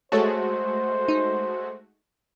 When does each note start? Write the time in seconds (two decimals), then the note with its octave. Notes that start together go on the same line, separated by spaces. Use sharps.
0.12 G#3 A3 F#4 A4 C5 C#5 A5
1.08 D#4